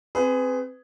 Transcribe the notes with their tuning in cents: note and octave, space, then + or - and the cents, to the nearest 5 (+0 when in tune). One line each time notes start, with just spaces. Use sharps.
C4 +0 G#4 +0 B4 +30